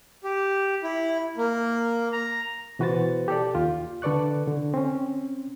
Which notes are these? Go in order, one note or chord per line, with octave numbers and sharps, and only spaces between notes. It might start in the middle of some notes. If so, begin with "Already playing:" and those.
G4
E4
A#3
A#5
B2 E3 F#4 B4 C5 A6
G4 A4 D5
D#2 F4
D3 A4 B4 D5 C#6 F#6
D3
C4 C#4